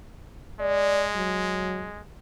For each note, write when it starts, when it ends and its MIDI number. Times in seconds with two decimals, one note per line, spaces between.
0.60 2.01 56
0.60 1.05 74
1.15 1.89 54